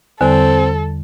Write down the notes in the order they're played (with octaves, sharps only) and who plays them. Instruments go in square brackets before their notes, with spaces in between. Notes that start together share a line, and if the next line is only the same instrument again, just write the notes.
[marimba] E2 D3 G3 [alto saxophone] C4 [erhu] A4